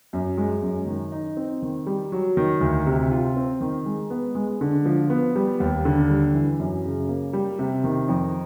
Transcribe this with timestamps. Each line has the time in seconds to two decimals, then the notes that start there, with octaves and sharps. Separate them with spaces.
0.13 F#2
0.38 G#3
0.62 F#2
0.87 D#3
1.12 D#4
1.37 C4
1.62 D#3
1.87 G3
2.12 F#3
2.37 D#3
2.61 D2
2.86 C3
3.11 F4
3.36 C4
3.61 D#3
3.86 G#3
4.10 B3
4.35 G#3
4.61 D3
4.86 F3
5.10 B3
5.36 G3
5.60 D#2
5.85 D3
6.09 G3
6.34 E3
6.59 F#2
6.84 C#3
7.09 A#3
7.33 G3
7.59 C3
7.84 D#3
8.09 F2